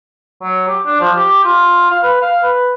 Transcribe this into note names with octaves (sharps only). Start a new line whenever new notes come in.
F#3
G4
D4
F3
G4
F4
F5
B4
F5
B4